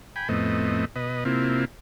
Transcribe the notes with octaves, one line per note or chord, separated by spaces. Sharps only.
G5 G#5 B5
F2 A2 A3 B3 C4 D#5
B2 B4 D#5
C3 A#3 C4 E4 F4